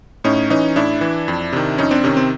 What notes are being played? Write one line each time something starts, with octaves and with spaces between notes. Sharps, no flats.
A2 C#4 D#4
E3 C#4 D#4
A2 D4 E4
E3
F2
C3 D#3
F2 C#4 D#4
C4 D4
C3 D#3 C#4
C4